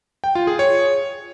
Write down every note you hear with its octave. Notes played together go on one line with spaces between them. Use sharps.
G5
F4
G#4
C#5